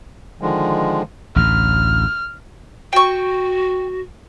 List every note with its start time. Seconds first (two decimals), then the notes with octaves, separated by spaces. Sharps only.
0.41 D3 D#3 F3 G#3
1.36 A1 D2 A2 F6
2.93 F#4 G5 C#6